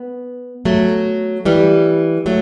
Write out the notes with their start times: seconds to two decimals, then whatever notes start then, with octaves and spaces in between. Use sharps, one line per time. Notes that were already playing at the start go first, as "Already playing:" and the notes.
Already playing: B3
0.65 F#3 A3
1.45 E3 G3
2.26 F#3 A3